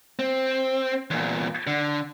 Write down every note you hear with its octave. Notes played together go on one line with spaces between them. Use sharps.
C4
E2 A#2
D3